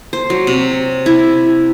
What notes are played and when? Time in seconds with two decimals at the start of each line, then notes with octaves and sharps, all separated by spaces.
0.13 C5
0.30 F#3
0.47 C3
1.06 E4